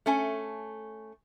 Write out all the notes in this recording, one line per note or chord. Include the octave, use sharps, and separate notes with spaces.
A3 C#4 G#5